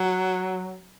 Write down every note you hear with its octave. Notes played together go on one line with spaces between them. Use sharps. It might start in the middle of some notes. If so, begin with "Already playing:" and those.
Already playing: F#3